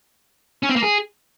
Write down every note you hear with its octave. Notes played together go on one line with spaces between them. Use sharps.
C#4
C4
A#3
G#4